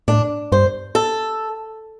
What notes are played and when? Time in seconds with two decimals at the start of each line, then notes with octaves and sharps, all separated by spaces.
0.08 A2 D4
0.52 G2 C5
0.95 A4